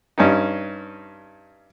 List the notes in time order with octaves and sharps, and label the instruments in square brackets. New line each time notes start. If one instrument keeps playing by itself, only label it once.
[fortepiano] G2 C#4 D#4